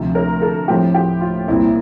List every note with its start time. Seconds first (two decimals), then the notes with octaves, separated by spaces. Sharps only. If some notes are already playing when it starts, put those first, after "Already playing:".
Already playing: D2 C3 F3
0.15 A#4
0.42 A4
0.68 A2 F3 C4 G4
0.94 G4
1.21 F4
1.48 C2 A#2 G3 C4 E4